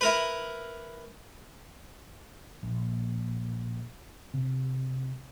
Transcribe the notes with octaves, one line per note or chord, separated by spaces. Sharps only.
E4 A#4 B4
A#1
C3